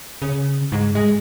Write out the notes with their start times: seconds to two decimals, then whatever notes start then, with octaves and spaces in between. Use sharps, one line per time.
0.22 C#3
0.72 G#2
0.95 G#3